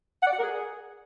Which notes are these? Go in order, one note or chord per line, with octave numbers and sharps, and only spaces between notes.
F#5
D5
F#5
A#4
G#4